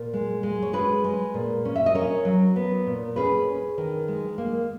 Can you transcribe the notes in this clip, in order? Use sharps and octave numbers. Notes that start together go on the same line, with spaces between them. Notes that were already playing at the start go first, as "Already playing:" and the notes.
Already playing: A#2
G#3
G#3
C#5
C#4 G#4 B4
G#3
A#2
C#4
E5
D#5
C#4 A#4 C#5
F#3
B3
A#2
C#4 G#4 B4
C#4
D#3
G#3
A#3